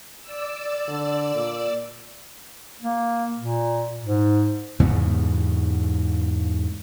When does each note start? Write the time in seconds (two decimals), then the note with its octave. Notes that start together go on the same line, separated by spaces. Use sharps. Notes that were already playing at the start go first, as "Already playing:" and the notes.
0.22 D5 E6
0.88 D3
1.35 A#2
2.81 A#3
3.37 A#2
4.02 G#2
4.80 E2 G#2 C#3 B3